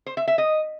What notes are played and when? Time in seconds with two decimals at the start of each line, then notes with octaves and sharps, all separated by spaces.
0.06 C5
0.17 E5
0.28 E5
0.38 D#5